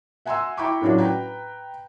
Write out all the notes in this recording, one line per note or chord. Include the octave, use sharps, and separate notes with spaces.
E5 F#5 G#5 A#5 C6 E6
E4 G5 A#5 B5 C#6 D6
A2 F#3 C#4 D4 F4 F#4
B4 G5 A#5